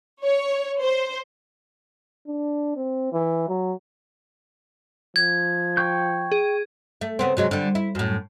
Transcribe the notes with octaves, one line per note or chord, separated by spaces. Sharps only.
C#5
C5
D4
C4
E3
F#3
F3 G#6
G5 C#6 G6
G#4
A3
C#3 B3 C4
C3 F#3 G#3
D3 G3
E4
F#2 A2